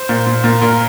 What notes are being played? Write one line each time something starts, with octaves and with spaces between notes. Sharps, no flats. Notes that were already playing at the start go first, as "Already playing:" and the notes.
Already playing: C5
A#2
A#2
A#2
A#2 A#4